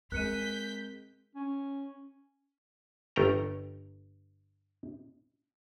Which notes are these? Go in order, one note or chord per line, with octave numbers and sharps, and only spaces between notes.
G#3 C4 A#4 F#6 G6 B6 C#7 D#7
C#4
G1 A3 C#4 G5 A#5